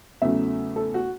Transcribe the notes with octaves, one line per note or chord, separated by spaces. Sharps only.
E2 C#3 F#3 A3 E5
A4
F#4